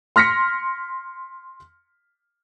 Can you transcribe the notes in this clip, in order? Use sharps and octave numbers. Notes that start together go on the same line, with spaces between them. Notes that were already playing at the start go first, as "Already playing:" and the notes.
C6 F6 A#6 B6 C#7